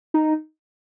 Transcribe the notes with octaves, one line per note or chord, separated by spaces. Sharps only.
D#4